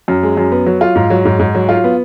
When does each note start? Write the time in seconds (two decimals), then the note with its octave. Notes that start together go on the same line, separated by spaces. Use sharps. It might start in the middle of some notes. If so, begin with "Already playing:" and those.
0.08 F#2
0.23 G#3
0.37 F#2
0.52 B3
0.66 F#3
0.81 F4
0.95 G#2
1.10 F#3
1.25 G#2
1.39 G#2
1.55 F#3
1.69 F4
1.84 B3